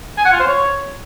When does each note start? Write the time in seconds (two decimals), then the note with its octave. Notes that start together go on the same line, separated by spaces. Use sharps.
0.18 G#5
0.25 F#5
0.32 F4
0.40 C5
0.47 C#5